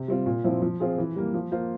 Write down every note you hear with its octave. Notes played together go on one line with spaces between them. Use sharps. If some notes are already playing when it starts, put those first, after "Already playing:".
Already playing: C3
G3 C4 F4
A#2
F3 C4 E4
F3
C4 F4 G#4
E3
G3 A#3
F3
A#3 F4 C5